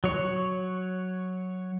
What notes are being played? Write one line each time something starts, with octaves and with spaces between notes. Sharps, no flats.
F#3 C#5